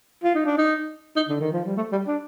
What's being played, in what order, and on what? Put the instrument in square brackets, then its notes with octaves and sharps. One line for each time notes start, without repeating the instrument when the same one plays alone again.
[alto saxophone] F4
D#4
D4
D#4
D#4
D3
D#3
F3
G3
A3
G3
D4